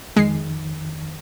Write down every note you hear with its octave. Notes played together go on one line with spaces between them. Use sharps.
F2 D#3 G#3 C7